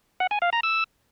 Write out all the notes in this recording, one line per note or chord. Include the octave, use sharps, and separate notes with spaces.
F#5
G#5
F5
A#5
E6